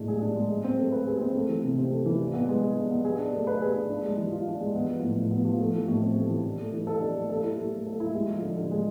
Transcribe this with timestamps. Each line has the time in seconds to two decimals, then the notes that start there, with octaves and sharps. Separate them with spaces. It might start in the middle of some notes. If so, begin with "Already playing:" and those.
Already playing: A2 G#3 D4
0.08 G#4
0.22 D4
0.36 G#3
0.49 G#4
0.64 C4
0.78 A3
0.92 B4
1.07 G#4
1.21 C4
1.35 A3
1.49 E3
1.63 C3
1.78 C4
1.91 A3
2.06 E3
2.20 D4
2.34 B3
2.49 G#3
2.63 G#4
2.76 D4
2.91 B3
3.05 G#4
3.18 D4
3.33 A3
3.47 B4
3.62 G#4
3.76 D4
3.89 D4
4.04 G#3
4.17 E3
4.32 F4
4.47 D4
4.60 G#3
4.75 B3
4.89 F3
5.03 A2
5.18 A2
5.31 B3
5.45 F3
5.59 A3
5.74 E3
5.88 A2
6.02 C4
6.16 A3
6.30 E3
6.44 D4
6.59 A3
6.73 E3
6.87 A4
7.01 D4
7.15 A3
7.30 A4
7.43 E4
7.58 A3
7.72 A3
7.87 A4
8.00 E4
8.14 G#3
8.28 F3
8.42 D3
8.56 D3
8.71 G#3